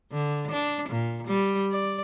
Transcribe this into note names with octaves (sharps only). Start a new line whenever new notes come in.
D3
D4
A#2
G3
D5